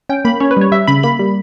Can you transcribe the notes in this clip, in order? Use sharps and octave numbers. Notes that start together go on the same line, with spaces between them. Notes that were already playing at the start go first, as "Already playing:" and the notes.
C#4 G5
A#3 B5
C#4 C#5
B4
G3 C#5
G3 E5
C#3 B5
A#3 B5
G3